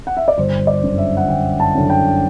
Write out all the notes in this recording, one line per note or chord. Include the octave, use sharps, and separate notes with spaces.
F#5
E5
D5
G1 C5
D5
F#2 D3
E5
F#5
G1 G5
A5
F#2 D3
G5